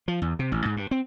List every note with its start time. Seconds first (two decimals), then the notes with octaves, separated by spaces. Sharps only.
0.08 F3
0.22 E2
0.39 C3
0.52 A1
0.65 G#2
0.77 G2
0.91 C4